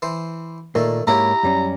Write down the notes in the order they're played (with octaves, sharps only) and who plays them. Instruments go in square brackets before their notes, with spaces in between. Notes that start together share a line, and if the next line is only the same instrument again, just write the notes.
[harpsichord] E3 C5
[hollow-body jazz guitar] A#2 A#3 [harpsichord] D#3 A3
[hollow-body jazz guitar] G#2 A#3 C#5 [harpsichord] E4 G4 [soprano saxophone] A#5
[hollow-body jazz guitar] F#2 G3 C#4